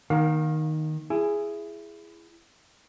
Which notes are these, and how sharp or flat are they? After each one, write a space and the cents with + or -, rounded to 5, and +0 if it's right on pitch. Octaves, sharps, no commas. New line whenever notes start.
D#3 -5 A#3 +15 F5 +30
E4 +20 G#4 +0